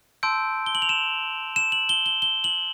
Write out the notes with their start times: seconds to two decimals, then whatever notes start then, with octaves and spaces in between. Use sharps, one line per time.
0.23 A5 C6 E6 G6 D7
0.66 G7
0.75 F#7
0.82 F7
0.89 E7
1.56 E7
1.72 F#7
1.89 G7
2.06 G7
2.22 G7
2.44 F#7